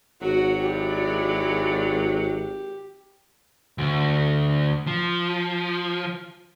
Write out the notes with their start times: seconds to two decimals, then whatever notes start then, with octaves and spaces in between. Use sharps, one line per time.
0.22 G#1 F#3 F#4
0.64 G#3 E4 G4 D5
3.78 D2
4.87 F3